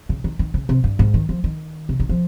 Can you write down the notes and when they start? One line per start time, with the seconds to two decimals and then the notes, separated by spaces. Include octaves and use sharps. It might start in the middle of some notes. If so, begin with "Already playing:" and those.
0.09 C#3
0.24 D#3
0.39 D#3
0.54 C#3
0.69 C3
0.84 G2
0.99 G#2
1.14 D#3
1.29 F3
1.44 D#3
1.89 C3
2.00 D#3
2.09 F3